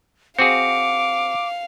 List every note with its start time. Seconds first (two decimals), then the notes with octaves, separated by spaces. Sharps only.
0.39 C4 F#4 G#4 F5 D6 C#7